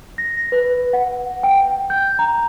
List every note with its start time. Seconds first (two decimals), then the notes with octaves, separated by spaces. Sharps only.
0.18 A#6
0.52 B4
0.93 F#5
1.43 G5
1.90 G6
2.19 A#5